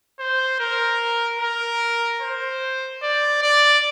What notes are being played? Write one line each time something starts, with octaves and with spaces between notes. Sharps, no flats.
C5
A#4
A#4
C5
D5
D5